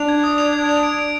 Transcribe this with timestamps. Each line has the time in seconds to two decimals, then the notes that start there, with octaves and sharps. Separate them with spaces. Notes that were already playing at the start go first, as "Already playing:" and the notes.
Already playing: D4 F7
0.09 G#6
0.24 D#6
0.38 F7
0.53 G#6
0.69 F7
0.83 D7
0.99 D7